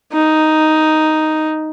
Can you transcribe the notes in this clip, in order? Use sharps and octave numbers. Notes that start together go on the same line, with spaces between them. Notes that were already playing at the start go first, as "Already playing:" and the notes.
D#4